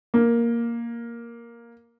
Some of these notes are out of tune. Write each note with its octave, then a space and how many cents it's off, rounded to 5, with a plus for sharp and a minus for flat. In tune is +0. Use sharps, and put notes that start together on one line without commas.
A#3 +5